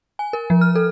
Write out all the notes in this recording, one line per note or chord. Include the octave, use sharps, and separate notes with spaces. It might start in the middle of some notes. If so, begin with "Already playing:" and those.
G#5
A#4
F3
F6
A4